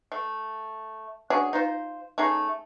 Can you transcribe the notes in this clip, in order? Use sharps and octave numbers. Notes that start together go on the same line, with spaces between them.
A3
C#4 D4 F#4 G#4
D#4 F4 C5
A3 C#4 D#4 G#4